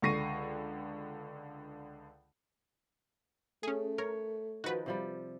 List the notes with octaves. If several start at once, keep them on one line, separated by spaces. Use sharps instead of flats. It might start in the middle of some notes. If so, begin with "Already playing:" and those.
C#2 D3 C#6 A#6 C7 D#7
A3 C#4 G#4
A#4 C#5
D#3 F3 F#4 B4
C3 F3 G3